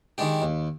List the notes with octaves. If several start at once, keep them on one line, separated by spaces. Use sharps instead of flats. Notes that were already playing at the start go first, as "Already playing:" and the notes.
D#3 G#3 D4 G4
D#2